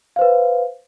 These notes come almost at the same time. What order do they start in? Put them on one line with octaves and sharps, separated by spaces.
F5 C5 B4